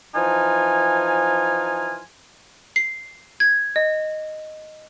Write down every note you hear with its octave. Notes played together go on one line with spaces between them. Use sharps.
E3 F3 D#4 F4 G#5
C7
G#6
D#5